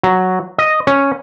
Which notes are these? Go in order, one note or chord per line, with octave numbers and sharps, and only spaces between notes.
F#3
D#5
C#4